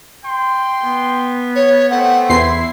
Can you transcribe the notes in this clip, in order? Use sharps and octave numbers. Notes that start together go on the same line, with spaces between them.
G5 C6
B3
C#5
A3 C4 F#5
E2 E4 C6 C7